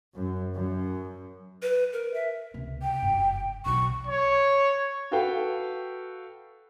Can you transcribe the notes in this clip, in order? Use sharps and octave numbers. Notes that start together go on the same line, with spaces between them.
F#2
F#2
B4
A#4
E5
C#2 C3
G5
F#1 G2
B1 B2 C#6
C#5
F#4 A4 B4 F5 G5